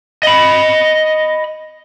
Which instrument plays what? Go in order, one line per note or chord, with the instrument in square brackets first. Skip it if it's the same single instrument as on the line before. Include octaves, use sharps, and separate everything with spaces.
[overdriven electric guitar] D#5 B5